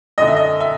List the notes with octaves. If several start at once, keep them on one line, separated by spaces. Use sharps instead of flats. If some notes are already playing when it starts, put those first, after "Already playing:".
F#2 D3 D#5
E5
D#5
E5